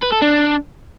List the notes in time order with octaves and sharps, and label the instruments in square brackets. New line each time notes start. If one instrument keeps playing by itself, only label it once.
[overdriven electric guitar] B4
A4
D4